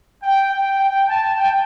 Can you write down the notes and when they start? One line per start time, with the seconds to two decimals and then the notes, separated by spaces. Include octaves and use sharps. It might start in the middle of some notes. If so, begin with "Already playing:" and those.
0.23 G5
0.50 G5
0.79 G5
1.07 A5
1.34 G5